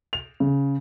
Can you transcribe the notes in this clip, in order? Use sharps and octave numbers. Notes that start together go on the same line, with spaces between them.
F7
C#3